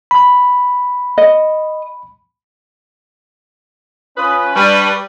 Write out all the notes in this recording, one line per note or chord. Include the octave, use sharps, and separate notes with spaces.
B5
D#5
C#4 F4 B4 D#6
G3 D4 B4 C#6